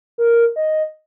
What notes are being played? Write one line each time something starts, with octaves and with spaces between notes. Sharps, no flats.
A#4
D#5